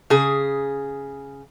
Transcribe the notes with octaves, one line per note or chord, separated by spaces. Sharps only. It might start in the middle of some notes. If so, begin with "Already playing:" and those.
C#3 G#4